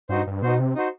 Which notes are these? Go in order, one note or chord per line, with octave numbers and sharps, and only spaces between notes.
G2 D#4 F#4 C5
G2
B2 D#4 F#4 C5
C3
D#4 F#4 C5